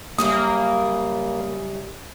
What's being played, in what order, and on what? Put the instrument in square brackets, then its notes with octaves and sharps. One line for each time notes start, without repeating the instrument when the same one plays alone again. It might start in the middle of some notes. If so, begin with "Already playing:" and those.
[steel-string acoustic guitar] F#2 C#3 G3 [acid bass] A#3 [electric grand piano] D#6